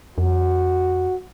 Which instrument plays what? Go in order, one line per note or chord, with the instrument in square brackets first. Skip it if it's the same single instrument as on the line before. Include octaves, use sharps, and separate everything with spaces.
[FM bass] F2 [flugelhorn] F#4